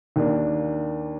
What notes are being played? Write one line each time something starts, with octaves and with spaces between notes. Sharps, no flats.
D#2 D#3 A#3 D4